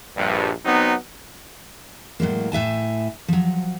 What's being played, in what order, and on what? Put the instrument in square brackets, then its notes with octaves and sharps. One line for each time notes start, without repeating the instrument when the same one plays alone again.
[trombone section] A#1 G2
F#3 B3 C4 D#4
[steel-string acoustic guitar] A2 F#3 G#3 A#3
A2 E5 G#5 A5
F3 F#3